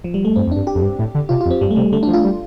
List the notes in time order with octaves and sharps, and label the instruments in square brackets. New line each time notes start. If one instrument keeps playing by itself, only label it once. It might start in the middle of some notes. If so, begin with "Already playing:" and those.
[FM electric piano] F3
G3
A3
[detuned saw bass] G2 [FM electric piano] C4
[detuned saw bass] F2
[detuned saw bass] G2 [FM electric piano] D4
[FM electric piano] G4
[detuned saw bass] F2
G2
A2
D3
[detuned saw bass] C3 [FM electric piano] F4
[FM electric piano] F4
[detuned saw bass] F2
[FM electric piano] C4
[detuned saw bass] G2 [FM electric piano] G3
[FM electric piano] A3
[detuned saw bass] C3 [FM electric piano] G3
[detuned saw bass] D3 [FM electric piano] A3
[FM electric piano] D4
[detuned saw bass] F3
[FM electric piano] F4
[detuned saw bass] G3